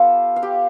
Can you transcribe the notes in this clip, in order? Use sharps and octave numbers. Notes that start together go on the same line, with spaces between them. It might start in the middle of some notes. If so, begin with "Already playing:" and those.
Already playing: B3 F4 G4 A4 F5
F5
G4 G5